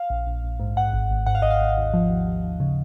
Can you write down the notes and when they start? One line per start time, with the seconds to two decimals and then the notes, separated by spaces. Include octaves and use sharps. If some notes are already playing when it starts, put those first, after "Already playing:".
Already playing: F5
0.10 A#1
0.27 A#1
0.44 A#1
0.60 G#2
0.76 G#2 F#5
0.94 G#1
1.10 G#1
1.26 G#2 F#5
1.35 F5
1.42 G#1 D#5
1.51 F5
1.60 G#1
1.77 D#2
1.94 F3
2.10 D#2
2.27 D#2
2.43 D#2
2.60 C#3